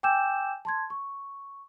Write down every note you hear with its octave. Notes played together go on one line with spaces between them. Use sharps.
G5 G#5 D6 E6 G6 E7
A5 C6 G#6
C#6